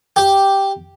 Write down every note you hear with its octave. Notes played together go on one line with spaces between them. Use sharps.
G4